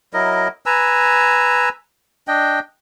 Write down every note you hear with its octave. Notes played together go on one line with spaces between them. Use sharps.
F#3 E4 A#4 D#5
B4 G#5 A#5 E6
D4 D#5 G5